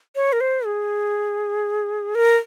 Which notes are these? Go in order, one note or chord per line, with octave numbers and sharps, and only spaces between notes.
C#5
A#4
C5
G#4
A#4